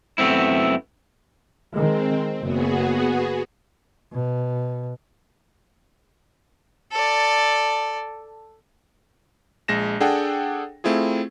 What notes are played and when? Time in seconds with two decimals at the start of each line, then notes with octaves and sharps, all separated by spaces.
0.18 F#2 A3 B3 C4 E4
1.73 D#3 G#3 C4
2.41 F#1 B3 F#4 G#4
4.13 B2
6.92 A4 D5
9.68 A#1 G#3 A#6 E7
10.00 D4 G#4 A4 F#5 G5
10.84 A3 C4 E4 F4 G#4